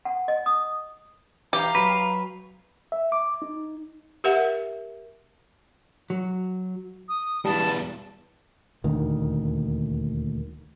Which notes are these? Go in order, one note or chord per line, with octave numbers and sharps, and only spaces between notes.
F#5
D#5
D#6
E3 G4 F5 A#5
F#3 B4
E5
D6
D#4
G4 A#4 E5 F#5
F#3
D#6
E2 G2 B2 G3 A5
D#1 D2 D#3